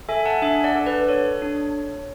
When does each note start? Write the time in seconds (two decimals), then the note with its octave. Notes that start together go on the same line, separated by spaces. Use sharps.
0.09 A4 E5 G#5
0.20 G#5
0.25 F#5 A5
0.42 D4 E5 G#5
0.64 D5 F#5
0.75 A4
0.86 B4 D5
1.08 A4 C#5
1.42 D4